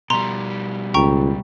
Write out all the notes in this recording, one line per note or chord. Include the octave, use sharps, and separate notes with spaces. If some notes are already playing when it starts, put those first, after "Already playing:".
B2 G3 A#5 C6
C#2 G5 A#5 C#6